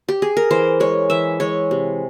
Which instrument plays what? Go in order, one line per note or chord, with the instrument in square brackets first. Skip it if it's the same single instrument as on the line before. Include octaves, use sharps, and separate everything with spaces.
[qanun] G4
G#4
A#4
E3 C5
G#3 C#5
E3 E5
G#3 C#5
C3